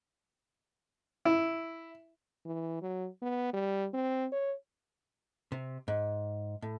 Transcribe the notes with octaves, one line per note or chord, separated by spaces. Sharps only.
E4
E3
F#3
B3
G3
C4
C#5
C3
G#2
A2